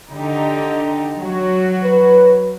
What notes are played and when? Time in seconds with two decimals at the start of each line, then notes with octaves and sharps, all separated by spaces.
0.10 D3 D#4 G4
1.19 F#3 F#4
1.84 B4